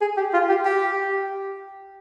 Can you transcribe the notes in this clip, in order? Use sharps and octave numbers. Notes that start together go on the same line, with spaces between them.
G#4
G4
F4
G4
G4